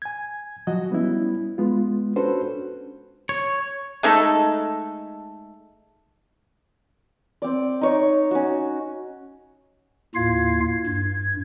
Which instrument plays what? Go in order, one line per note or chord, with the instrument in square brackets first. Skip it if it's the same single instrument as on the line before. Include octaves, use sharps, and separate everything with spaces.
[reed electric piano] G#5 G#6
F3 F#3 F#4 D#5
G3 B3 C#4 E4
G#3 B3 F4
C#4 D4 F#4 A4 B4 C5
[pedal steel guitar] C#5
[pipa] G#3 A3 D#4 A4
[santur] C4 D5
D#4 C#5
C#4 F#4
[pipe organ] D#2 A2 F4 F5 G#6
G2 G#6